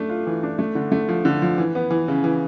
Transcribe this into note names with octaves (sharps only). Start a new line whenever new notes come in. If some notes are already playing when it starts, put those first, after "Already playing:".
Already playing: A3 D4
F4
E3
D4
A3
D3
A3
F3
D3
F3
E3
B3
E3
C#3
E3